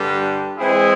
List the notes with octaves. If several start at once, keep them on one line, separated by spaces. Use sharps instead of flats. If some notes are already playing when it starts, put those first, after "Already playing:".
Already playing: G2 D3 G3
E3 G#3 C4 E4 G#4